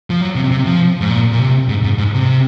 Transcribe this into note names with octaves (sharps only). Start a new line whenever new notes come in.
F3
F#3
C3
C3
F3
G#2
A#2
A#2
C3
G#2
G#2
G#2
C3